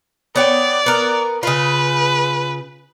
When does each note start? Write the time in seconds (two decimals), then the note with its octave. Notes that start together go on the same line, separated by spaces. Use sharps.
0.36 B3 C#5 D5 G5
0.86 B3 A#4
1.43 C#3 F4 B4